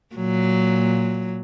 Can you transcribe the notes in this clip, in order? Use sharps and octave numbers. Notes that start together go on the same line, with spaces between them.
A#2 F#3